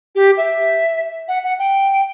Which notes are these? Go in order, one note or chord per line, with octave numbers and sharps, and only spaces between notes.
G4
E5
F#5
F#5
G5